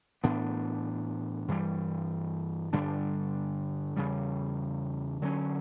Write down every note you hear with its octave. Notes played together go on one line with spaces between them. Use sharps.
A2 E3 B3 D4
G2 E3 G3
G2 D3 G3 D4
E2 C#3 G3
D3 F#3 C#4